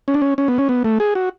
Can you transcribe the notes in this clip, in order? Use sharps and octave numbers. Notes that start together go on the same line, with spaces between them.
C#4
D4
C#4
C#4
B3
C#4
B3
A3
G#4
F#4